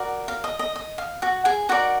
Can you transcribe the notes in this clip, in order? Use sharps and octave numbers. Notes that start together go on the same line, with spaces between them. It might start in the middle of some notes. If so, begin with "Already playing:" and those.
Already playing: F#4 A#4 D5
F5
D#5
D#5
D#5
F5
F#4 F#5
G#4 G#5
D#4 F#4 A#4 D5 F#5